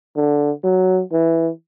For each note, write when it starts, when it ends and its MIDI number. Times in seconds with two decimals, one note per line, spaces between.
0.16 0.51 50
0.64 1.01 54
1.13 1.49 52